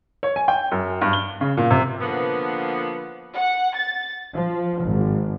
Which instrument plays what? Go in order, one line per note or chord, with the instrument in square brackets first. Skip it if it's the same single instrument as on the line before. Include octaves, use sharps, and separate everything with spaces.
[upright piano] C#5
G#5
G5
F#2
G2
G7
C#3
A#2
C3
[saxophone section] D3 F3 A#3 B3
[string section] F#5
A6
F3
G#1